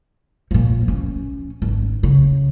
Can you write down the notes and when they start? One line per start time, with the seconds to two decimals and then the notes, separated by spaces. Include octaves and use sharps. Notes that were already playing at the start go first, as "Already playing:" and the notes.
0.51 A#2 F3
0.88 C#4
1.62 G#1
2.03 C#3